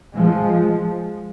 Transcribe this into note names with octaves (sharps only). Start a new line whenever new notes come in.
F3 G#3